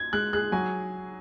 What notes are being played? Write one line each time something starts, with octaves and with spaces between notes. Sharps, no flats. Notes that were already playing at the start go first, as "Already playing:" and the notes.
Already playing: G#6
G#3 F#6
G#4 F#6
F#3 G#5